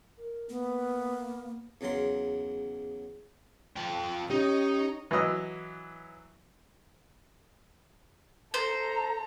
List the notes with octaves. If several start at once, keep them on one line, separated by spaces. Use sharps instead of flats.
A#4
A#3 B3
E2 C#3 F#3 A#4 C6
F3 G5
C#4 D#4 G4 C#5 D#5
E3 F#3 D#5 E6
A4 C5 A#5